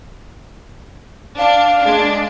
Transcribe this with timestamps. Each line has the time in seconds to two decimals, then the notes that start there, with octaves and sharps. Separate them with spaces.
1.38 D4 F5
1.80 G#3 D4